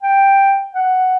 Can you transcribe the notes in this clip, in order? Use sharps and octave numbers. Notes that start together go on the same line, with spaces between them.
G5
F#5